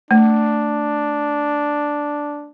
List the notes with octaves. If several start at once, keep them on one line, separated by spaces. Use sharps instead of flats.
A3 D4